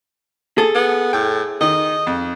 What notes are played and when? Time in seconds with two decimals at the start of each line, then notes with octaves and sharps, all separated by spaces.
0.58 G#4 A4
0.75 B3
1.13 A2 G5
1.61 D#3 D#5
2.07 F2